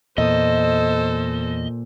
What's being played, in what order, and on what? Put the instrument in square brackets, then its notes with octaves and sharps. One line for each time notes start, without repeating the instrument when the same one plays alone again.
[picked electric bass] E2 [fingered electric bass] A#2 [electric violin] A4 C5 [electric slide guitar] D#5